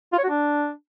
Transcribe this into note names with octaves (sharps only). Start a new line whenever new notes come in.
F4
C#5
F#4
D4